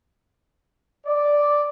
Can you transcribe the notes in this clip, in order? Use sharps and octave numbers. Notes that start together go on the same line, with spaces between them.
D5